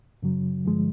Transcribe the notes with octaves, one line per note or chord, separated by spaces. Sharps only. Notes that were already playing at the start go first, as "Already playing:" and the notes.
F#2 C#3 F#3
G2 D3 F3 G#3